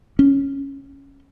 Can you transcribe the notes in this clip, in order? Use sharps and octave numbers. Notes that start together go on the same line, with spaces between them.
C#4